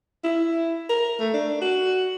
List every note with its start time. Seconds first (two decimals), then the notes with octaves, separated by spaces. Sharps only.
0.24 E4
0.89 A#4
1.20 A3
1.34 D4
1.62 F#4